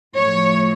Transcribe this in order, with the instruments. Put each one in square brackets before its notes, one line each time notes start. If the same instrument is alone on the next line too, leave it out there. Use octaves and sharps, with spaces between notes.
[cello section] A2 F3 C#5